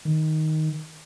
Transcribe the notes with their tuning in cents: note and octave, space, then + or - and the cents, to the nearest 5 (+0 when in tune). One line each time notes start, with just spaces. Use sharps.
D#3 +5